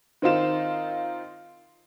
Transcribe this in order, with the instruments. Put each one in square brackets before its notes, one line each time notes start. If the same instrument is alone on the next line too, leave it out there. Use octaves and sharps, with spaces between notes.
[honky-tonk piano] D#3 C4 D#4 F4 E7